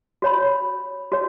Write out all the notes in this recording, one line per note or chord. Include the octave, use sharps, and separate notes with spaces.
F#4 C#5 B5
F#4 C#5